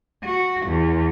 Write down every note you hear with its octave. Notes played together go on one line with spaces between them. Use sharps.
F#4
E2